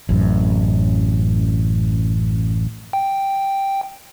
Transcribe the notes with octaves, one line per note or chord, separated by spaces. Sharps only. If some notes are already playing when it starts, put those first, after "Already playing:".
A1 F#2
G5